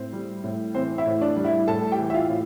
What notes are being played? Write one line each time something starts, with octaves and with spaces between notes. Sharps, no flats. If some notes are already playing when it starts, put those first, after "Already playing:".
Already playing: A2 C4 C5
G3
A2
E3 C4 C5
E4 E5
A2
D4 D5
G3
E4 E5
A2 A4 A5
G4 G5
E3
E5
F4 F5
A2